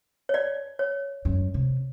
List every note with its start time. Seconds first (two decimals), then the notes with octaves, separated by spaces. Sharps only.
0.29 C#5
0.34 D5
0.79 C#5
1.25 F#2
1.54 C3